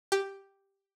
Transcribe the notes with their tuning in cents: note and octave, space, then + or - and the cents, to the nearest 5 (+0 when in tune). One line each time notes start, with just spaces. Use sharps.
G4 +0